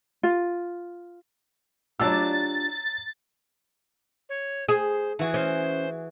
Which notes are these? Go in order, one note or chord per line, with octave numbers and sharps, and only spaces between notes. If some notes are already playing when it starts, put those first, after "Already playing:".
F4
F#3 D4 F4 G4 A5 E6 A6
C#5
G#4 C5
E3 F#4 G#4
C#4 C5